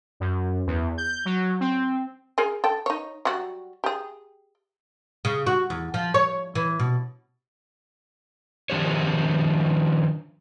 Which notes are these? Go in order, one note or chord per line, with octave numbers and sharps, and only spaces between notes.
F#2
E2
G6
F#3
C4
G#4 A#4 G#5
A4 G5
D#4 C#5
F#3 G3 F#4
G4 G#4
C#3
F#4
E2
F3
C#5
E3
B2
D#3 F3 D4 G4 C5 C#5